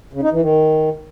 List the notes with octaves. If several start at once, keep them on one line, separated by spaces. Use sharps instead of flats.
C#3
D#4
E3
D#3